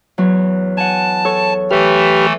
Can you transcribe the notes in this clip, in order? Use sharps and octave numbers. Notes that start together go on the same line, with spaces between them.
E2 F#3
F#5 G#5 A5
A4 C#5 C#6
E3 A3 G4 B4 F6